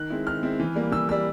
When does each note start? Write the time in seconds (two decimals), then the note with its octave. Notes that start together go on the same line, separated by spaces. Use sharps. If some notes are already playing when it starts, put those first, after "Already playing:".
Already playing: D#3 F#6
0.10 G#3 C4 E4
0.27 D#3 F6
0.43 G#3 C4 E4
0.60 E3
0.75 G3 A#3
0.92 E3 E6
1.08 G3 A#3 E6